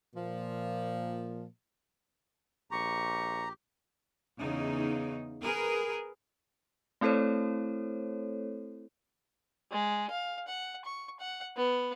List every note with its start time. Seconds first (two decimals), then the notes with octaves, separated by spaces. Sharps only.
0.14 A#2 F3
2.71 A#1 G4 A#5 C#6
4.40 E2 C#3 D#4
5.42 G#4 A#4 B4
7.01 A3 C4 E4 A4 C5 C#5
9.72 G#3
10.11 F5
10.48 F#5
10.85 C#6
11.20 F#5
11.57 B3